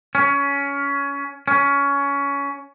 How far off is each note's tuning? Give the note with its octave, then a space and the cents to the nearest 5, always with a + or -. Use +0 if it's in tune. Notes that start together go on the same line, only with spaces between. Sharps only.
C#4 +20
C#4 +20